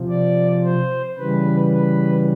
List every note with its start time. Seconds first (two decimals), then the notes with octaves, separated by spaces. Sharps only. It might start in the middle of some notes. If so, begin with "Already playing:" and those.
Already playing: C3 F3
0.09 D5
0.64 C5
1.18 C#3 E3 G3 B4
1.73 B4